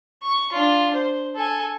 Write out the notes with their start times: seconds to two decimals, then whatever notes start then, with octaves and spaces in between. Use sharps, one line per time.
0.23 C#6
0.53 D4 F4
0.94 C5
1.36 A4 G#5